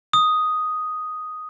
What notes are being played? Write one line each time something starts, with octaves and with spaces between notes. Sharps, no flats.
D#6